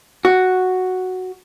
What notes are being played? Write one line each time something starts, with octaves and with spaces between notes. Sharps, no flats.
F#4